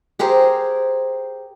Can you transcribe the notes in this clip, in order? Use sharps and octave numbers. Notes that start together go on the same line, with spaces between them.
G4 G#4 A#4 C5